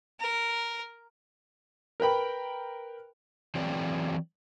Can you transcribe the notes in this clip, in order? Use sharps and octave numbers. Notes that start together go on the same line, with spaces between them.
A#4
A#4 B4 G5 B5
E3 F#3 C4 G#4 D5 G5